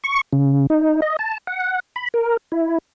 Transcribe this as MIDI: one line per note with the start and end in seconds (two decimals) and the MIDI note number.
0.04 0.21 85
0.33 0.66 49
0.70 1.00 63
1.02 1.16 75
1.19 1.38 81
1.47 1.80 78
1.96 2.08 83
2.14 2.37 70
2.52 2.78 64